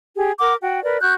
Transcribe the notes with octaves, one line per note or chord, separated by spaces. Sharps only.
G4 G#4
A#4 F#5 D6
F#4 G5
A#4 B4 D5
F#4 C#6 F#6 G6